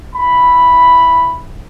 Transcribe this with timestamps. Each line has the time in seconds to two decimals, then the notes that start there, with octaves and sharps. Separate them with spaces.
0.15 E4 B5